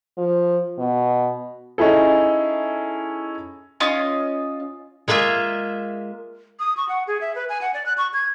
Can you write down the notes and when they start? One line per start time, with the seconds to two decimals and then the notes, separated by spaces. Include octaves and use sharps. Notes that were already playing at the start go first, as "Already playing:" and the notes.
0.18 F3
0.78 B2
1.78 C#4 D#4 E4 G#4 A4
3.80 C#4 F4 D#5
5.08 G#3 A#3 F4 G#4 E5
6.60 D#6
6.77 C#6
6.89 F#5
7.07 G#4
7.21 E5
7.35 B4
7.49 G#5
7.61 F#5
7.74 D5
7.86 F#6
7.98 C#6
8.14 G#6